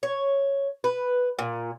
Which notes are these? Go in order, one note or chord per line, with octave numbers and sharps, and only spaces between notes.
C#5
B4
A#2